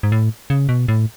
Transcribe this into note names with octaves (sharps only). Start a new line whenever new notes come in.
G#2
A2
C#3
B2
A2